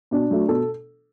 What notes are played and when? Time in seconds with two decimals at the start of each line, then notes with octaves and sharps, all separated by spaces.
0.11 B2 D4
0.31 F#3 A3
0.48 B2 A4